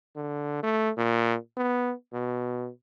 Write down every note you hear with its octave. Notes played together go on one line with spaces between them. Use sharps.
D3
A3
A#2
B3
B2